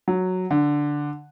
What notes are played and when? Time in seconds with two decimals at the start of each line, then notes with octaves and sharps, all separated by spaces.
0.08 F#3
0.51 D3